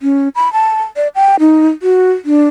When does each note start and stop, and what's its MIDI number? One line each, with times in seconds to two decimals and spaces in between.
0.02 0.29 61
0.35 0.52 83
0.53 0.82 81
0.96 1.08 74
1.15 1.36 79
1.40 1.68 63
1.82 2.10 66
2.25 2.47 62